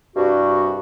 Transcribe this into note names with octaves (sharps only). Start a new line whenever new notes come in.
C2 G2 F#4